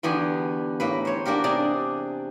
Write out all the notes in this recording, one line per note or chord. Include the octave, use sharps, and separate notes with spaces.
E2 D3 B3 F#4 G4 G#5
A2 A#3 B4
C5 C#5
A#3 D4 F#4 G4 A#4
C3 D4 G#4 D5 A5 A#5